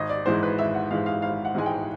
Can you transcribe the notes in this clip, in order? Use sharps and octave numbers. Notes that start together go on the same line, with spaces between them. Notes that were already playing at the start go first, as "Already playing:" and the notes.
Already playing: G#1 D#5
D5
G#2 E3 G#3 C5
B4
G#1 E5
F#5
G#2 E3 G#3 F5
F5
G#1 F5
F#5
G#2 E3 G#3 G#5
G5